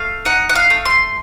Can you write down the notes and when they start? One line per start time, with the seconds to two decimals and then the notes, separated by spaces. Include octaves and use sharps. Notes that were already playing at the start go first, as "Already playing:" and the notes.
Already playing: A3 F5
0.25 D#4 F#5
0.49 F#5
0.55 F5
0.70 A3
0.85 C6